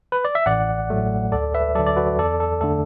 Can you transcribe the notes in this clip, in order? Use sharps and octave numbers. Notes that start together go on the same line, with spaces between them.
B4
D5
E5
A1 D5 F#5
A2 F#3 A3
D2 A4 D5
B4 E5
D3 F#3 A4 D5
D5
F#4 B4
E2 A4 D5
A4
D3 A3 A4